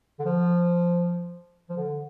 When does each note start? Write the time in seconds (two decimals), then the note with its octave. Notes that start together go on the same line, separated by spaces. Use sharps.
0.20 D3
0.25 F3
1.70 F3
1.77 D3